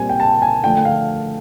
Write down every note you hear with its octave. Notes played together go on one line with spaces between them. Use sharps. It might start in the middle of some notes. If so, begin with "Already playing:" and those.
Already playing: A#2 G3 C4 G#5
G5
A5
G#5
D3 F3 A3 G5
F5